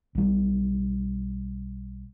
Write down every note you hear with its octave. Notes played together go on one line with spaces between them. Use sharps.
B1 G3